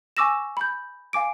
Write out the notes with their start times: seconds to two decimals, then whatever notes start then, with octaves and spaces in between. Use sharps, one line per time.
0.17 G#5 C#6 D6 E6 A#6 E7
0.57 B5 G6
1.13 F5 G#5 D6 D7